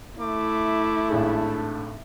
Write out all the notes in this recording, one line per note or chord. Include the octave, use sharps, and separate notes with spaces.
A3 E4 D6
G#1 A2 D4 G#4